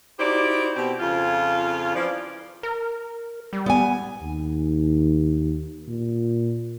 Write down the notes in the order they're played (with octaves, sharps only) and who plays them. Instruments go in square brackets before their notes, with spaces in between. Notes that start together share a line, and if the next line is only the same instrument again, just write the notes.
[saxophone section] D#4 E4 F#4 G4 C5 D5
B2 C4 G4
F2 C#3 F3 F4
E3 F3 D5
[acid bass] A#4
G3
[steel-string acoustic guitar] B3 G#5
[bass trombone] D#2
A#2